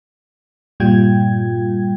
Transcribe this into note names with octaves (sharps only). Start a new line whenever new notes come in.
G2 A#2 G3 F4 G5 G#6